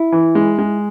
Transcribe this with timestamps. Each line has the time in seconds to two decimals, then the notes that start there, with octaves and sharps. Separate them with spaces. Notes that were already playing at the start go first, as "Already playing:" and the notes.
Already playing: E4
0.12 E3
0.35 G#3
0.58 G#3